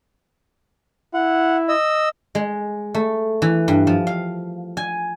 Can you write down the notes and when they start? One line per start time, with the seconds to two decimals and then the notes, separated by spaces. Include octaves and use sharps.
1.14 E4 F#5
1.69 D#5 E6
2.35 G#3
2.95 A3
3.42 E3
3.68 G2
3.87 F3
4.07 F5
4.77 G#5